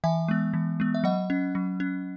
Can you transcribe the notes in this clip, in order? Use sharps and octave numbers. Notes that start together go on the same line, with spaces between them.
E3 E5 G#5
G#3 B3
E3
G#3 B3
E5
F#3 D#5 F#5
C#4
F#3
C#4